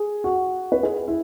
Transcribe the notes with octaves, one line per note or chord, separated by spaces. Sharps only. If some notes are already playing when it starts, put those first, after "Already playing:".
Already playing: G#4
F#4
B4
G#4
E4